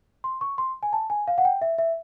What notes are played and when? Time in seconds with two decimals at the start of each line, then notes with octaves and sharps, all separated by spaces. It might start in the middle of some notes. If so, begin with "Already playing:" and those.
0.24 C6
0.41 C#6
0.58 C6
0.83 G#5
0.93 A5
1.10 G#5
1.28 F5
1.38 F#5
1.45 G5
1.62 E5
1.78 E5